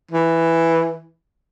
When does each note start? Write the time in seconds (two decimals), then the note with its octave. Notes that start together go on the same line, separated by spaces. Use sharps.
0.11 E3